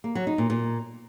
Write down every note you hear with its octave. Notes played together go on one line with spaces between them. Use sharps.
A#3
F#3
D#4
A#2
A#2